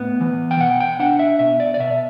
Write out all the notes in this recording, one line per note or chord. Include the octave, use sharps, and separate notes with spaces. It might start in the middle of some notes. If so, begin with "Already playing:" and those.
Already playing: A2 B3
E3
G5
B2 F#5
G5
D4 F#5
E5
B2 E5
D5
D5
B2 E5